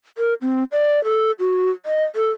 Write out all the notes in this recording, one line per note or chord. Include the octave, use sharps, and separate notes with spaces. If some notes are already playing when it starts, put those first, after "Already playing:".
A#4
C4
D5
A4
F#4
D#5
A4